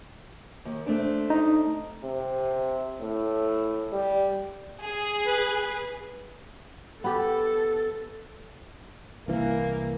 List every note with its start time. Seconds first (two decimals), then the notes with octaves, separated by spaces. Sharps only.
0.65 D#2
0.86 A3 C4 D4
1.30 D#4
2.03 C3
3.01 A2
3.92 G3
4.81 G#4
5.27 B4
7.04 B3 G4 A4
9.28 C2 E3 A#3